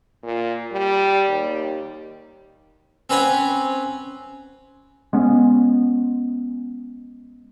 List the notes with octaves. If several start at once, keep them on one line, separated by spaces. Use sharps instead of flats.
A#2
G3
D#2
C4 C#4 B4 C#5 F#5
G#3 B3 C#4